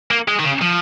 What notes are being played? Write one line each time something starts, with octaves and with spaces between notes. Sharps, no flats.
A#3
G#3
D#3
C#3
F3